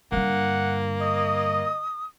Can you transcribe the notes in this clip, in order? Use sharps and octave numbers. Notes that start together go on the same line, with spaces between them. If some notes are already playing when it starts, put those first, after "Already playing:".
G2 D3 A#3 F#5
D#5 D#6